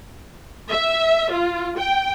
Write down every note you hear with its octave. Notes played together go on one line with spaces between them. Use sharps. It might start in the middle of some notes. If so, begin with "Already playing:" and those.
E5
F4
G5